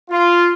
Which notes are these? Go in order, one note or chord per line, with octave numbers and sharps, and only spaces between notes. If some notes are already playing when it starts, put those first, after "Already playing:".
F4